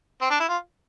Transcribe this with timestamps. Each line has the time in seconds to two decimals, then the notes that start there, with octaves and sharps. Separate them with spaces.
0.21 C4
0.30 D4
0.40 E4
0.49 F4